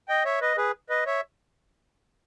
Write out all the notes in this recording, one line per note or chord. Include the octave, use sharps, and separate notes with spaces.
D#5 G5
C#5 E5
B4 D#5
G#4 B4
B4 D#5
C#5 E5